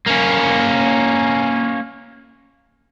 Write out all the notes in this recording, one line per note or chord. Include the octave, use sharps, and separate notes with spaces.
A#3 C#4